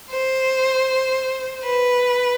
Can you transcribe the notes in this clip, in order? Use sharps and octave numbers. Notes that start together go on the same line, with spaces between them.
C5
B4